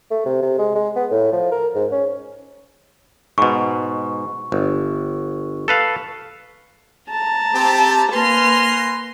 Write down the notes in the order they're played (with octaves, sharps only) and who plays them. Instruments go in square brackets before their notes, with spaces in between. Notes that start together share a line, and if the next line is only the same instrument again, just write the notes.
[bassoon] A3
C3
C3
G#3
G#3
B3
A2
F3
A#4
G#2
C#4
[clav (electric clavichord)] G#2 B2 [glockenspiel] C#6
[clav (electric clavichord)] G1
A4 B4 F5
[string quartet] A5 A#5
[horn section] C4 G4
[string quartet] A#3 F6 A#6 [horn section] B4 G#5 C6